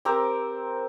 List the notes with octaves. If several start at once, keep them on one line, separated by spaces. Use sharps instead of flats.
C4 G4 A#4 C5